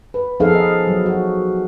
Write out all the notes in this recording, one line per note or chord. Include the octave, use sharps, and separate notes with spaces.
B4
F3 B3 D#4 G#4 A4 F5
D#5
F#3
F#4